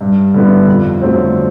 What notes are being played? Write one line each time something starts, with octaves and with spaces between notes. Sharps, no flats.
G2
D3 G3 B3 E4
F2
D3 F#3 A3 C4